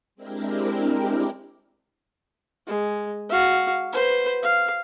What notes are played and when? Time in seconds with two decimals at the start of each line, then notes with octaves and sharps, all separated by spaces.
0.15 G#3 C4 D4 E4 G4 A#4
2.67 G#3
3.29 F#4 F5
3.93 B4 C5
4.43 F5